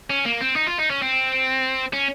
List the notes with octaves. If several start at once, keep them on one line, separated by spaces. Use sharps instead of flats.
C#4
A#3
C4
D#4
F4
D#4
C#4
C4
C#4